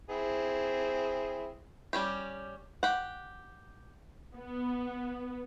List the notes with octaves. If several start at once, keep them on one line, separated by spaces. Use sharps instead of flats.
C4 E4 G#4
G3 C#4 G4
G4 F#5
B3